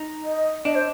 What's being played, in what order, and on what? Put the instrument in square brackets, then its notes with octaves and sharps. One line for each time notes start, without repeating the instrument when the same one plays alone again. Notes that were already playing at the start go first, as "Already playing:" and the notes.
Already playing: [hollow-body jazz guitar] D#4
[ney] D#5
[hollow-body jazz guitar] D4 [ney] D#5
[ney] C5